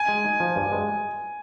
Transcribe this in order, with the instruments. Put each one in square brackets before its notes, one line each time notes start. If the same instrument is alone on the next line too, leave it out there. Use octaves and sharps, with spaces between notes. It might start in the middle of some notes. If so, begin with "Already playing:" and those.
Already playing: [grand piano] G#5
[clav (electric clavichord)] G#3
D#4
F3
G2
G#3